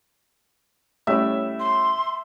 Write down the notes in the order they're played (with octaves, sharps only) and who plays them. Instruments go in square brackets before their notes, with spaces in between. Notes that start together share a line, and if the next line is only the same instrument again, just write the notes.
[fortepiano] A2 G3 C#4 [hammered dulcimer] E5
[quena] C6